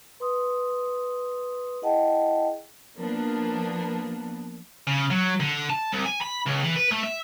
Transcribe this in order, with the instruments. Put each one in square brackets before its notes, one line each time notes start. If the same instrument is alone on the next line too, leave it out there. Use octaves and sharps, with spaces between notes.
[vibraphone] B4 C6 D#6
E4 G#4 D#5 F#5 G5 A5
[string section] F3 A#3 B3 D4
[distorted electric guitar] C#3
F#3
D3
A5
C2
G#5
B5
C#2
E3
B4
A3
E5